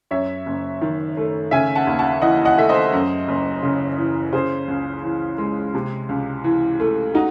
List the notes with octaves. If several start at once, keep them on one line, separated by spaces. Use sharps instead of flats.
F#2 C#5 E5
F#1
D#3
A3
C#3 E5 G#5
F#5 A5
D#2
F#5 A5
E3 D#5 F#5
D#5 F#5
A3 E5
C5 D#5
F#2
F#1
C#3
E3
C#3 G#4 C5
C#2
E3
G#3
C3
C#2
E3
A3
D#4 F#4